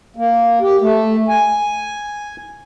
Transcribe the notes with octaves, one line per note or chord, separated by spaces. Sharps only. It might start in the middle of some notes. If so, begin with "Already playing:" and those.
A#3
G4
A3
G#5